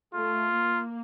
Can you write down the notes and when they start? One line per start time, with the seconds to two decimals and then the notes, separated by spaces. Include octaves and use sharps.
0.13 A3 F4
0.51 A#3